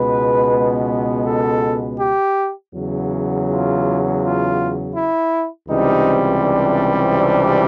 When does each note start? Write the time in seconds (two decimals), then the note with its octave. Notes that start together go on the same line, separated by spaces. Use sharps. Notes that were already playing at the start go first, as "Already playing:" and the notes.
Already playing: C#2 B2 G#3 B3 B4
1.25 A4
1.99 G4
2.73 E2 C#3 F#3
3.47 F4
4.21 F4
4.95 E4
5.68 C#2 C3 E3 G3 C4 D#4
6.43 D4
7.17 D4